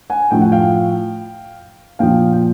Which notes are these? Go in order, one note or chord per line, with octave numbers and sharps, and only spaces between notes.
F#5 G#5
A2 F3 G5
F#5
F5 G5
A#2 F3 F5 G5
G5